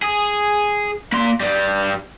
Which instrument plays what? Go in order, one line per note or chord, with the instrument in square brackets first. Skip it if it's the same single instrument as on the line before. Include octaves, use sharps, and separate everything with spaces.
[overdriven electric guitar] G#4
A#3 C6
G2 G3